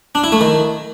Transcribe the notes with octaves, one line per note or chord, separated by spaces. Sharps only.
D4
E4
A3
D#3